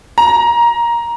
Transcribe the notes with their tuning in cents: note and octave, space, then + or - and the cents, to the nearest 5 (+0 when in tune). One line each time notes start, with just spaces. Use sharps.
A#5 +15